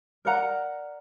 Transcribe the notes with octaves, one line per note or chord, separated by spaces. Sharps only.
A#4 D5 F#5 A#5